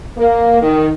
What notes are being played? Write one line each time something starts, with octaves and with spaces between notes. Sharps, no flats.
A#3
D#3